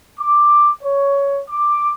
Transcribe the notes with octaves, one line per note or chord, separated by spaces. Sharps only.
D6
C#5
D6